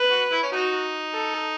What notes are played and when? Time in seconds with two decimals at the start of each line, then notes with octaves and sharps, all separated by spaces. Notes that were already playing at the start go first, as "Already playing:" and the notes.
Already playing: B4
0.10 F#4
0.31 E4
0.43 C#4
0.52 D#4 F#4
1.14 A4